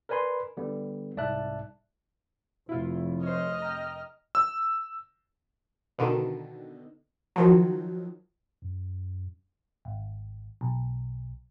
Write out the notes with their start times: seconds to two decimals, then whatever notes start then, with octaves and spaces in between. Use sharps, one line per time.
0.09 A#4 B4 D5 G#5 B5 C6
0.57 D3 G3 B3
1.17 C2 G#2 D5 E5 A5 F#6
2.69 F1 E4 F4
3.23 C5 C#5 D#5 F6
3.62 G5 A#5
4.35 E6
5.99 B2 D3 D#3
7.36 D#3 F3 F#3
8.62 F#2
9.85 G#1
10.61 B1